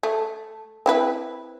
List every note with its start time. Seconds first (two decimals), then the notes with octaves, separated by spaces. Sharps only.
0.03 A3
0.86 C4 E4 B4